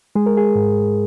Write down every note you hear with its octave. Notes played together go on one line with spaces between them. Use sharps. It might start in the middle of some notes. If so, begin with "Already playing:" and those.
G#3 G#4
A#4
G#4
G#2